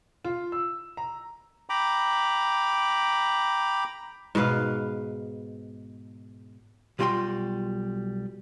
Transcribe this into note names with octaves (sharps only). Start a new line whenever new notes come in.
F4
E6
A#5
G5 A#5 B5 D6
G#2 B2 B4 F5
B1 G3 F4 F#4 G5 C6